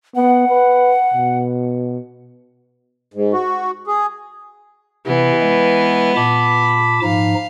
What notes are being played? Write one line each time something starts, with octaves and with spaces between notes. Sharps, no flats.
B3 F#5
B4
B2
G#2
F#4
G#4
C3 E3 B3
G#3
A#2 A5 B5 D6
G#2 F3 D#4 F5